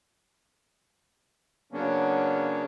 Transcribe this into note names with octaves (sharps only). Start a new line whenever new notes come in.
C#3 F#3 A#3 B3 C#4 D4